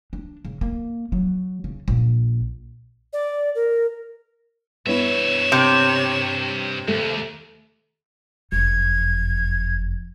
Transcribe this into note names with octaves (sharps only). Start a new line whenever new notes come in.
D4
C#3
A#3
F#3
C#3
A#1
D5
A#4
G2 B3 E4 C#5 E5 E7
C3
D#2 A3
F#1 F2 G#6